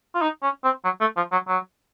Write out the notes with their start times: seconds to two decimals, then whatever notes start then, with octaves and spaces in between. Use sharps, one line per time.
0.15 F4
0.22 D#4
0.43 C#4
0.64 C4
0.85 F#3
1.01 A3
1.17 F3
1.32 F#3
1.48 F#3